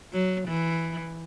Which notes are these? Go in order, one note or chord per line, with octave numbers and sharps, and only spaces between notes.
F#3
E3